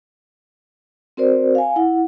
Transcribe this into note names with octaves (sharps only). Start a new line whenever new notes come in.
C4 F#4 A#4 C5 D5
F5 G#5
E4 F#5